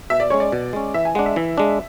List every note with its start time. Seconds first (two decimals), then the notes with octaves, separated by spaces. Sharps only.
0.10 B2 E5
0.20 D5
0.30 G#3 C#4 C#5
0.40 D5
0.52 B2
0.73 G#3 C#4
0.94 E3 E5
1.05 G#5
1.15 G#3 D4 F#5
1.26 E5
1.36 E3 E5
1.58 G#3 D4